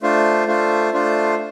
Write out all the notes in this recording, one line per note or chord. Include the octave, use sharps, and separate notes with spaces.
A3 D4 F4 C5
A3 D4 F4 C5
A3 D4 F4 C5